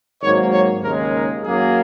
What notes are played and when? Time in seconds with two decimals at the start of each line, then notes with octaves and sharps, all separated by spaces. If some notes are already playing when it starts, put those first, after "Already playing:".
0.21 G#1 G#2 F#3 A#3 C#5
0.52 C#5
0.82 D#2 C#3 G#3 A#4
1.12 A#4
1.43 F#2 F#3 A#3 G#4